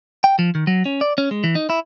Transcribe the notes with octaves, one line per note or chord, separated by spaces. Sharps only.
G5
F3
D#3
F#3
C#4
D5
C#4
G#3
E3
D#4
E4